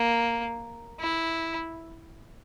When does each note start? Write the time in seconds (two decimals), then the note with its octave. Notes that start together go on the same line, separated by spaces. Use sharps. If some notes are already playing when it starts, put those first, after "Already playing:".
Already playing: A#3
1.00 E4